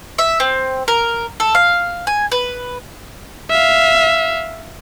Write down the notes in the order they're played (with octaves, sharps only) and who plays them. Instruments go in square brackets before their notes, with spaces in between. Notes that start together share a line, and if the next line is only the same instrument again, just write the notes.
[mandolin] E5
C4
A#4
A4
F5
G#5
B4
[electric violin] E5 F5